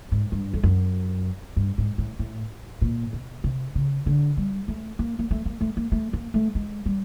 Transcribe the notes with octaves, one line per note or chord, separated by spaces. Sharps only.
G#2
G2
F2
F#2
G2
G#2
A2
A2
A#2
B2
C3
C#3
D3
G3
A3
A#3
A#3
A3
A#3
A3
A#3
A3
A#3
A3
G#3
G3